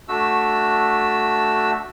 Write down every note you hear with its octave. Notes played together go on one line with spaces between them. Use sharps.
A3 D4 F#4 E6